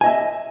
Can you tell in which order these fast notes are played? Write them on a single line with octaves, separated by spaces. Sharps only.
G#5 D#5 E5